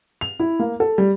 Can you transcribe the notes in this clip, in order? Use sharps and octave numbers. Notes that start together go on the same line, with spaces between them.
F7
E4
A#3
A4
G3